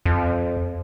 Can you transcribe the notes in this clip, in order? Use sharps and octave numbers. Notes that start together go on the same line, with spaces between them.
F2